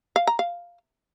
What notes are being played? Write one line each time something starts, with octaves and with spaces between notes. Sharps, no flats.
F5
A#5
F5